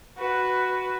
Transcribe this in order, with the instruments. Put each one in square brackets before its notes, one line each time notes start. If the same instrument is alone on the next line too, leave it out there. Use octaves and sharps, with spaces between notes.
[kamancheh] F#4 B4